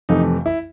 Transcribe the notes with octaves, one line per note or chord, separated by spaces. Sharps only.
F2 C3 E3 A3 D#4
E4